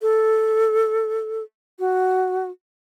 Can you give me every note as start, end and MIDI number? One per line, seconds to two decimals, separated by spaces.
0.02 1.43 69
1.79 2.50 66